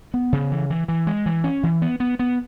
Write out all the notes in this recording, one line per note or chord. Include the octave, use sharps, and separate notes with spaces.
B3
C#3
E3
E3
E3
G#3
E3
C#4
E3
B3
B3
B3